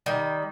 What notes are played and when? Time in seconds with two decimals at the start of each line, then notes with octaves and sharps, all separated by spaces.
0.06 D#3 G3